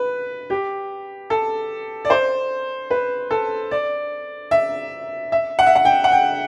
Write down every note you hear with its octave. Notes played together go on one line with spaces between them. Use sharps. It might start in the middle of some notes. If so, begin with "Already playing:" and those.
Already playing: B4
G4
A4
D5
C5
B4
A4
D5
E5
E5
F#5
E5
F#5
G5
F#5
G5